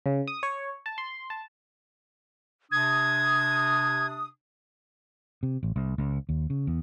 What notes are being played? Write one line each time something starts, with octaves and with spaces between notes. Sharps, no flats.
C#3
D#6
C#5
A5
C6
A5
C3 D4 D#6 G#6
C3
A1
C2
C#2
D#2
C#3
E2